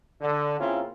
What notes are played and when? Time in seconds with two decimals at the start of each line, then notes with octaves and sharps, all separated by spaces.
0.21 D3
0.59 C#3 A#3 C4 C#4 E4 F4